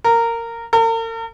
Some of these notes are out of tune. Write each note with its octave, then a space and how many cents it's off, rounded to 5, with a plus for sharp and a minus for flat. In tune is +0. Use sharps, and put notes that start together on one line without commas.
A#4 -15
A#4 -45